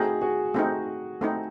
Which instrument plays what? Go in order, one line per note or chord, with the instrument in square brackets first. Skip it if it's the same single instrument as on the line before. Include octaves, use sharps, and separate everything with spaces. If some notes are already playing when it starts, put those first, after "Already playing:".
Already playing: [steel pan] A3 C4 D#4 [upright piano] F#4 G#4
[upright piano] F#4 G#4
[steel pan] A3 C4 D#4
A3 C4 D#4